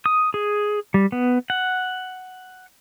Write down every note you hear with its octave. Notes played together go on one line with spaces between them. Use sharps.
D#6
G#4
G3
B3
F#5